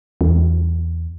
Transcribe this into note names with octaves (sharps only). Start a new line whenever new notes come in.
E2